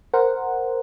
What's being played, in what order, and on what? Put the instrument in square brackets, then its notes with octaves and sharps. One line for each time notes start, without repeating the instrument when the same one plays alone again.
[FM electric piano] A#4 C5 F#5